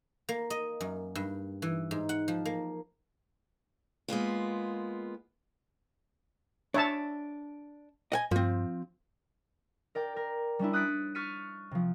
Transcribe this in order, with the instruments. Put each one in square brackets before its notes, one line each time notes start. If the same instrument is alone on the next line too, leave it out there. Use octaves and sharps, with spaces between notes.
[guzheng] A#3
D#5
F#2
G2
E3
G#2
F#5
F3
A#3
[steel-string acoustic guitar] G#3 A#3 B3 F4
[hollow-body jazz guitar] D4 [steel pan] C#5 E5 A5
[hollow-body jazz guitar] D#5 F#5 G#5
[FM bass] G2 [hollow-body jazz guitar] F3 C4
[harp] A#4 D5 G5
A#4
G3 C#4 D4 E4
D#6 F#6 A6 B6 C#7 D7
C#6 F6 A6 B6 C#7 D#7
C3 F3